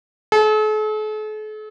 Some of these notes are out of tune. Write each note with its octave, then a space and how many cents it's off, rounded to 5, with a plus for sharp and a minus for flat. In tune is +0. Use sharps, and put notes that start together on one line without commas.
A4 -45